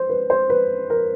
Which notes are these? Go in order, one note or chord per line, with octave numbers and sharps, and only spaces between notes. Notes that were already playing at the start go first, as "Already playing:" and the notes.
Already playing: C5
B4
C5
B4
A#4